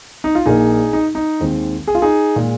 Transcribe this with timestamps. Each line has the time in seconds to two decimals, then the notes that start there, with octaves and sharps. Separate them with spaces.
0.24 D#4
0.35 F4
0.46 A#1 A#2 A#3 D#4 G#4
0.93 D#4
1.15 D#4
1.40 D#2 D#3 G#3 C4
1.87 G#4
1.95 F4
2.02 D#4 G#4
2.36 A#2 G#3